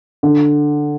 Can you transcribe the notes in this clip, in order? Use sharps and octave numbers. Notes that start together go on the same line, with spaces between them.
D3